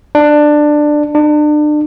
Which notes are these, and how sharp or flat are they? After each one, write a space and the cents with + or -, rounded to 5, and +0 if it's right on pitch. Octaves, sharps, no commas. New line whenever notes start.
D4 +15
D4 +35